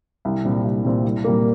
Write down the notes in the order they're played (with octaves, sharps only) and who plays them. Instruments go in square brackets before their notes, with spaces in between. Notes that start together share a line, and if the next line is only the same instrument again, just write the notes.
[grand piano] C2
A#2 G3 C4
C2
A#2 G3 C4
C2
A#2 G3 A#3